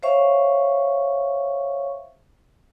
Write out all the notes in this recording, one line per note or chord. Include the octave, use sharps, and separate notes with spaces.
C5 C#5 E5 F5 C#6